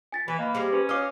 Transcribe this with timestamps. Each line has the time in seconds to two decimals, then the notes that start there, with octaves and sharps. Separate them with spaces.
0.12 G#5 A6 B6
0.28 E3 B4
0.39 A#3 D#5 B5
0.55 G3 G#3 C4
0.73 C#4 B4
0.89 C#5 D#5 F5 D6 F6